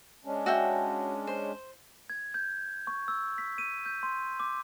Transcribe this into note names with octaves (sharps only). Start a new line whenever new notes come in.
G#3 C#4 D4
F#4 E5 G5
C5
G#6
G6
C#6
E6
B6
D#7
G6
C6
D6